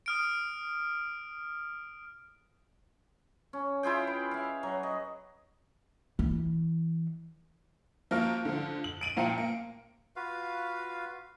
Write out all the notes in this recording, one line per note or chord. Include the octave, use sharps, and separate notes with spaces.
D#6 F6 D7
C#4
E4 F4 G#4 G5
B4
E5 F5
F#3
D#5
E3
F3 A#3 F#4 F6
D3 F3
F#7
D7 D#7 F#7
A#2 F3 F5 G5 A#5 C#7
A#3
F4 F#4 B4 F5